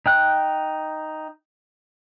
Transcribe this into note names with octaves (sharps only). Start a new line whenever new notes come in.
D#4 G5 F#6